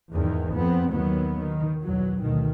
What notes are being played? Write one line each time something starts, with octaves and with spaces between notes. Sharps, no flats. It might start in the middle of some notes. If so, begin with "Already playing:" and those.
E2 G#2 D#3
F2 B3 C4
D#2 D#3 F#3 B3
D#3
B1 E2 F#3
D2 B2 D#3